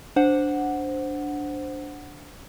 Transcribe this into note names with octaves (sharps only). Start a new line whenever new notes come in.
D4 C5 F#5